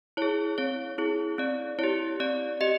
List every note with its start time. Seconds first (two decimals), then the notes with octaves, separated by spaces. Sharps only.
0.17 E4 G#4 C#5
0.58 C4 C#5
0.98 E4 G#4
1.38 C4 D5
1.79 E4 G4 C#5
2.20 C4 D5
2.61 G4 D#5